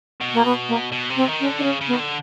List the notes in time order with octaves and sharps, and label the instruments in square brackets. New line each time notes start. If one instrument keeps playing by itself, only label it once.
[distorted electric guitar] B2
[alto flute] A#3
B3
A#3
[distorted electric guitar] B2
C3
[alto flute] C4
[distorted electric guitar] D#3
[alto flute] C#4
[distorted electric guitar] D3
[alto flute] D4
[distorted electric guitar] C#3 [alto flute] C#4
[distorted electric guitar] C#3
[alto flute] B3
[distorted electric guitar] D#3
D3